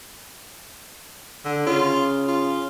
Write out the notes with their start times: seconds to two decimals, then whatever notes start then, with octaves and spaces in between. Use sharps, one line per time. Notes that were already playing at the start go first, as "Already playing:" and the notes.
1.45 D3
1.66 C#3 F4
2.28 F4